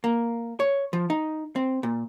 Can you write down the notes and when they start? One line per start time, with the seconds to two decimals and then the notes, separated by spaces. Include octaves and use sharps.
0.04 A#3
0.60 C#5
0.93 F3
1.10 D#4
1.56 C4
1.83 A#2